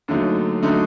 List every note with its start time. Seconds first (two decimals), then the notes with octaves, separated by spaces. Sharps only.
0.08 D#2 D3 F#3 A3 D#4
0.63 D3 F#3 A3 D#4